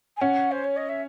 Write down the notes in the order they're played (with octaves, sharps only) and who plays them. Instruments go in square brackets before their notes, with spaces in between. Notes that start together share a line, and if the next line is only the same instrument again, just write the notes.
[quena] G#5
[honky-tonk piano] C#4 [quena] F#5
[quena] C5
C#5
D#5
E5